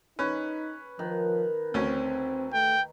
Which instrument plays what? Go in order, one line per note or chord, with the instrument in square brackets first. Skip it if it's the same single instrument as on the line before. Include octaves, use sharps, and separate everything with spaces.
[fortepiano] C#4 [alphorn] D#4 [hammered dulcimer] B4
[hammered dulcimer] D#3 [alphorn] F3
[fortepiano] D2 C#4 [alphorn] C4
[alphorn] A3 [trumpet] G5